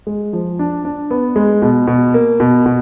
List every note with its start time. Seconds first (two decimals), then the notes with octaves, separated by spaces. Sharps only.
0.07 G#3
0.33 F3
0.59 D4
0.85 D4
1.11 B3
1.36 G#3
1.62 B2
1.87 B2
2.14 A#3
2.40 B2
2.66 B2